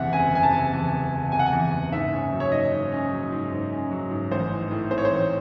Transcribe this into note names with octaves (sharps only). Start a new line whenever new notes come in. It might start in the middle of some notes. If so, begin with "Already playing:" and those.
Already playing: F#1 E2 C3 E5 F#5
F#1 G#5
F#1 G#5
A5
C3
E2
F#1
F#1
C3 G#5
F#5
G#5
E2
F#1
G#2 E5
C#4
F#3
C#5
G#2 D#5
G#2
C#4
F#3
G#2
G#2
C#4
F#3
G#2
A1 C5
E3
A2
C4 C5
C#5
C5
A1